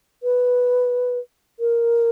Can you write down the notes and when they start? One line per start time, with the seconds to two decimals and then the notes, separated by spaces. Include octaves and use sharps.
0.23 B4
1.60 A#4